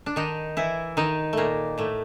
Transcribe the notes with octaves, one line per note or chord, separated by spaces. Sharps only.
D4
D#3 D#4
E3 E4
D#3 D#4
A#2 A3 A#3
A2 A3